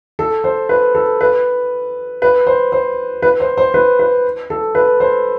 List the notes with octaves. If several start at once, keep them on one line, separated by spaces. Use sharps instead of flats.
A4
C5
B4
A4
B4
B4
C5
C5
B4
C5
C5
B4
B4
A4
B4
C5